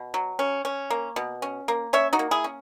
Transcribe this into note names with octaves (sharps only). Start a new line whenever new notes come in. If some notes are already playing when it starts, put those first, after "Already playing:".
Already playing: B2
F#3
C#4
C#4
A#3
B2
C#4
A#3
C#4 C#5 E5
D#4 F#4
A#3
E4 G#4
C#4